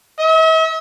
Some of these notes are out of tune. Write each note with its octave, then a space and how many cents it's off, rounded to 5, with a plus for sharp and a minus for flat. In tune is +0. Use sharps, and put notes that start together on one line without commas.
E5 -45